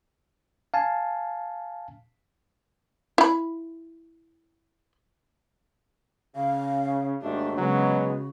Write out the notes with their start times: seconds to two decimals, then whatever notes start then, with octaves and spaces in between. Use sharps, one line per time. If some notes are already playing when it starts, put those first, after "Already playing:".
0.74 F5 G#5 A5
3.18 E4 B5
6.36 C#3 F5
7.22 D#2 G#2 A3 D4 F#4
7.58 C#3 F#3 G#3 B3